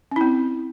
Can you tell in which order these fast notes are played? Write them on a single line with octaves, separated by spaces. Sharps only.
C#4 E4 C4